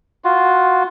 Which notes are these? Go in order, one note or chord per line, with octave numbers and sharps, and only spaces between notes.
F4 F#4